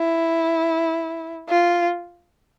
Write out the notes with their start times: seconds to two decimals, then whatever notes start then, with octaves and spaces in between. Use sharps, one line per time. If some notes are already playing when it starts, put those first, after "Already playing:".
Already playing: E4
1.49 F4